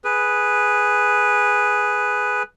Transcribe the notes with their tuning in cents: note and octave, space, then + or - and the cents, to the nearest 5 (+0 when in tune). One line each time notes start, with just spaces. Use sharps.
G#4 +0 B4 +0